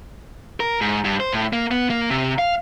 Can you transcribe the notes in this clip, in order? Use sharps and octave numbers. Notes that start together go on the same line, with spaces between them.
A#4
G#2
G2
C5
A2
A#3
B3
A#3
C3
F5